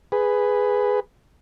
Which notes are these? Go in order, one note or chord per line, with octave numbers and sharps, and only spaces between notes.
G#4 B4